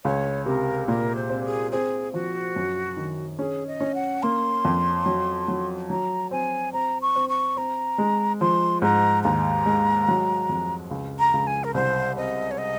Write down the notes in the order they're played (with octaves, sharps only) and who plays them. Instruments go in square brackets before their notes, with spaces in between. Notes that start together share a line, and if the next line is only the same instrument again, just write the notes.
[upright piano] C#2 [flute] C#5
[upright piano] C3 [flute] A#4
[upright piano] A#2 [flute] A#4
[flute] C5
[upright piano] C4
[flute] G#4
[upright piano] C4 [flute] G#4
[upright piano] F3 [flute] F#4
[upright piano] F#2
D#3
[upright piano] C#4 [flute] G#4
[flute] D#5
[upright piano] C#4
[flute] F#5
[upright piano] A#3 [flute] C6
[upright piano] F2
F#3
F#3
[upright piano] F#3 [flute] A#5
[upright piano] C4 [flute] G#5
[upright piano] C4 [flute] A#5
[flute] C#6
[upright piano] C4
[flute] C#6
[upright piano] C4 [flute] A#5
[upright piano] G#3
[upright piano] F3 [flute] C6
[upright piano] G#2 [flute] A#5
[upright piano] D#2 [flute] A#5
[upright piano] G#3
F#3
F2
C#2
[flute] A#5
[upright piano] C#2
[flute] G#5
A#4
[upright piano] C2 [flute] C5
[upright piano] C4 [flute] D#5
[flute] C#5
D#5